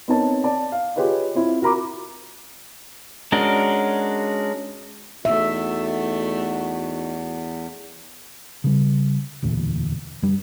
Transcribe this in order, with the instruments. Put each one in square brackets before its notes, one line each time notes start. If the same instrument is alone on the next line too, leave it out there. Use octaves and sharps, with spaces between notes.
[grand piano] B3 C4 D#4 A#4 C#5 A5
D5 A5
F5
F4 G4 G#4 B4 C#5 D#5
C4 E4 F4
F#4 A#4 A#5 B5 D6
[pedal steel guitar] G#3 C#4 D4 F#4 A#4
[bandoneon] E2 [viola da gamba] A3 [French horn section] D#4 F#4 [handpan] E5
[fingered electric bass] C#3 G3
E1 D2 A#2 E3
F#2 G3